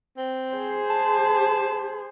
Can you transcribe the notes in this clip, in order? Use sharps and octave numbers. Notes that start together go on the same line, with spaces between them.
C4
G#4 C5
A5